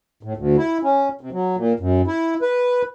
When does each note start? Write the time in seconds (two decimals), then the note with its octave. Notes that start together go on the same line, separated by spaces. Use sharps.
0.23 A2
0.37 D2
0.58 E4
0.83 C#4
1.21 C3
1.32 F#3
1.57 A#2
1.79 F#2
2.07 E4
2.42 B4